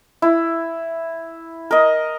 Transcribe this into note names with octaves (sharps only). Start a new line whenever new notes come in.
E4
A#4 D#5